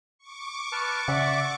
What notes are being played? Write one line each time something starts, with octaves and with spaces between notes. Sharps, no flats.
C#6 D6
B4 A5 F6
C#3 D5 E5 F#5